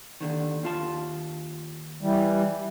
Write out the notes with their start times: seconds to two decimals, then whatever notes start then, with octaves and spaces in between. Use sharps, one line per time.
0.21 D#2 D3 D#3
0.63 D#2 F4 A5
2.02 E3 G3